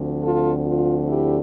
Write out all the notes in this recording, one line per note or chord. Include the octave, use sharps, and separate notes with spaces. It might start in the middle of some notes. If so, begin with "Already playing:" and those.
Already playing: D2 D3 F3 C4
F4 A4
F4
E4 G4